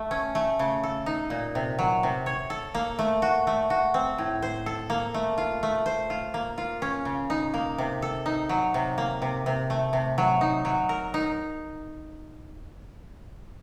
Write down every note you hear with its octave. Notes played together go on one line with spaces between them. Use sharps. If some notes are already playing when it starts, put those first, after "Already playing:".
Already playing: A3 A4
C#4
A3
C#3
A4
D#4
A#2
C3
F#3
C3
C#5
A4
A#3
A3
F#4
A3
F#4
C4
A2
C5
A4
A#3
A3
F4
A3
C5
F4
A#3
F4
C#4
C#3
D#4
A#3
C3
A4
D#4
F#3
C3
A#3
C3
C3
A3
C3
F#3
D#4
F#3
A#4
D#4